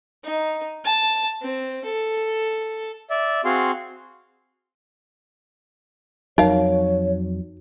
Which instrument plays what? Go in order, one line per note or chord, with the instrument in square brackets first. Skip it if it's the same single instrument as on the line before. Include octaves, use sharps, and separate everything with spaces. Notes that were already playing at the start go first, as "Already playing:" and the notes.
[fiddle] D#4
A5
C4
A4
[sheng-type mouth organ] D5 E5
C4 F#4 G#4 F5 C6
[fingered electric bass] F2 F#3 [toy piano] D#4 [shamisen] A#4 F5 [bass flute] C#5